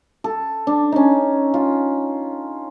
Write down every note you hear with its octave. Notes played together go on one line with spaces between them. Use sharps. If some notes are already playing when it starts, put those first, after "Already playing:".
A4
D4
C#4 D#4
F4